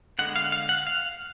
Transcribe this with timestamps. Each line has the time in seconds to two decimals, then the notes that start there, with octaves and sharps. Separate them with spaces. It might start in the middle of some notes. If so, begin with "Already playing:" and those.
0.19 D3 G#3 B3 F#5
0.36 F5
0.52 F5
0.69 F#5
0.87 F5